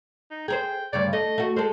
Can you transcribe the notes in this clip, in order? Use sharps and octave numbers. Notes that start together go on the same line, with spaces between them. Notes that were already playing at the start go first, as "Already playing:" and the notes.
D#4
G#4 A#4 C5 G5
D2 G2 C#3 D5
A3 D#5
A3 F#4
G#3 A4 C5